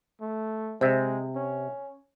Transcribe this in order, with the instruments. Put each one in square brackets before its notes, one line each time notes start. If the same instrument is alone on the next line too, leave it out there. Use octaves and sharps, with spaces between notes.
[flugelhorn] A3
[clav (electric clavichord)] C3 [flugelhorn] G#3 [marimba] C5 E5 E6
[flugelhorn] C#4